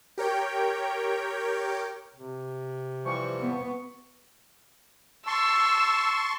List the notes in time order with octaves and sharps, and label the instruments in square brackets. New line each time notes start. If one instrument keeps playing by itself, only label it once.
[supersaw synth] G4 A#4 C#5 G5
[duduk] C3
[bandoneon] E3 F3 G3 [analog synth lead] C#6
[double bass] B3
[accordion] A5 C6 C#6 [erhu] E6